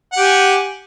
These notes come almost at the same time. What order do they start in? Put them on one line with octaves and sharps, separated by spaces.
F#5 G4 G#5